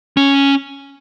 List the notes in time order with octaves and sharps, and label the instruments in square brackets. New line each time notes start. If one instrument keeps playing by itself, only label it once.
[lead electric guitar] C#4